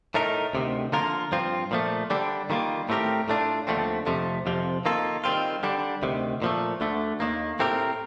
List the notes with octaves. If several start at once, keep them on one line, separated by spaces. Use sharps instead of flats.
A2 A3 D#4 A#4
D2 C3 D#3
D3 F3 A#3 F4 A#4
G2 F3 C4 F4
A#2 F3 A3
D3 G3 D4
D#3 G3 A#3 F4
A2 A3 C4 G4 A#4
A2 A3 D4 F4
D#2 D3 F3 A3 C4
F2 C3 F3 A3
F2 C3 F3
D#3 A#3 F4 A4
D#3 G3 C4 F4
D3 G3 D4
D2 C3 D#3
A#2 F3 A3
D2 D3 A3
D#2 D#3 A#3
A2 A3 C4 G4 A#4